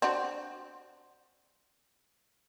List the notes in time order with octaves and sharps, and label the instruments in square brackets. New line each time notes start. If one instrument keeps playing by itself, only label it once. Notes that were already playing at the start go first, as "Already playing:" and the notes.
[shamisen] C4 D4 F#4